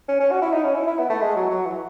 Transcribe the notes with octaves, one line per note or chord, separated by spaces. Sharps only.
C#4
C#4
F#4
E4
D#4
C#4
E4
E4
B3
A3
G#3
F#3
F#3
E3